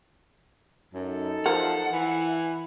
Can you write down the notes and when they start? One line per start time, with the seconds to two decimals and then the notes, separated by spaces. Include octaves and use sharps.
0.94 F#2 D#4 A4
1.46 F3 A#4 F#5
1.92 E3 E4